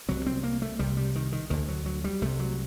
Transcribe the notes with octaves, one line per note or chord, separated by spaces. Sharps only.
C2 C3 F#3
C4
A#3
A3
C2 C3 G3
G3
D#3
D#3
D2 D3 D#3
F#3
F#3
G3
C2 C3 A3
F#3